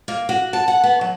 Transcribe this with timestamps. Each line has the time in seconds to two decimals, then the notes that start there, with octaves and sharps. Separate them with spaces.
0.08 A#3
0.29 F#4
0.53 A5
0.68 F#5
0.84 B3
1.01 F#3